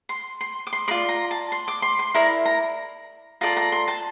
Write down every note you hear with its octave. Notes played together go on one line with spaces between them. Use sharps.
C6
C6
D6
C6
F4 A#4 D5 C6
A#5
A5
C6
D6
C6
C6
E4 A#4 D5 A#5
A#5
F4 A4 D5 A#5
A#5
C6
A5